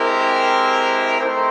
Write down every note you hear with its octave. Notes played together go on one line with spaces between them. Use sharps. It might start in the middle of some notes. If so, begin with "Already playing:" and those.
Already playing: G#3 C4 E4 G4 A#4
A3 C4 D#4 G4 C5